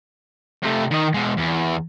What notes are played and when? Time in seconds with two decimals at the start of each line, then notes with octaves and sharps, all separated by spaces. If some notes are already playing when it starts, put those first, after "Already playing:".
0.62 C3 A3
0.91 D#3 D#5
1.14 B2 G#3
1.37 E2